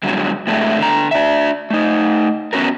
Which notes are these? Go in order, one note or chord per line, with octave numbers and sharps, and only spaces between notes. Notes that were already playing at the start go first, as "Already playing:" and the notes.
G2 D3 F#3 G#3
A2 C3 G#3 A3 D4 E5
D3 A#5
D4 E5
A3 D#4
B3 C#4 F#4 A#4